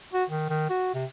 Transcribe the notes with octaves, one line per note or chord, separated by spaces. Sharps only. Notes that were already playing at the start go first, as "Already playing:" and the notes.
F#4
D#3
D#3
F#4
C3